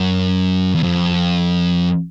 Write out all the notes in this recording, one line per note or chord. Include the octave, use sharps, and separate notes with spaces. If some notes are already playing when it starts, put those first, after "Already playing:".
Already playing: F#2
E2
F2